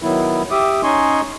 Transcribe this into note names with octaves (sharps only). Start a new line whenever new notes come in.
D#3 F#3 B3 E4
G4 E5 D6 D#6
C#4 D#4 D#5 G#5 C6 C#6